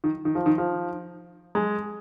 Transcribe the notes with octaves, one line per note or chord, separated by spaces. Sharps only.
D#3
D#3
F3
D#3
F3
G#3